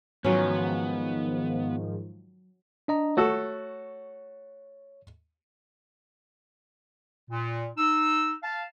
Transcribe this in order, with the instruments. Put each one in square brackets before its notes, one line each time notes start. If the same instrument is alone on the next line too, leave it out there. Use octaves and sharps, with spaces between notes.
[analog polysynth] G#2 D#3 F3 [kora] F#3 C#4 [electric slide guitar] B3
[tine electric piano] D4 D#5 A#5
[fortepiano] A3 F#4 A4 [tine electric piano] C#5
[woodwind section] A#2
D#4 E6
F5 A5